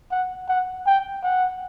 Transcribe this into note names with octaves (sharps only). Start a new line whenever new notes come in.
F#5
F#5
G5
F#5